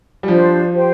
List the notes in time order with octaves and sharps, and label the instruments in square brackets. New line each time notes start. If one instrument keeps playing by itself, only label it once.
[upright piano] G3
[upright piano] F3 [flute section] D4 G4 C5
[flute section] G4 C5 G5